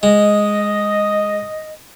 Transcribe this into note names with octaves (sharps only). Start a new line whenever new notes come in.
G#3 D#5